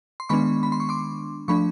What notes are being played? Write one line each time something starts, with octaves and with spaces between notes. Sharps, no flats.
C6
D#3 G#3 B3 D4 B5 C#6
B5
C6
C#6
C6 D6
F3 A3 D4 B5 C#6